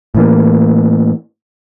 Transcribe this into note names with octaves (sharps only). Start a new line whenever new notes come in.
A2 E3 A#3